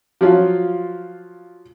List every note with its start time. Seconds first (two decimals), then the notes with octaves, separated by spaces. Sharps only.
0.21 F3 F#3 F4